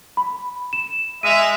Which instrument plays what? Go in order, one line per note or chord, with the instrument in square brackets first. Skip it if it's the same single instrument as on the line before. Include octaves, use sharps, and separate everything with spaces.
[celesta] B5
E7
[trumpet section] G#3 E5 [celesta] D#7 F7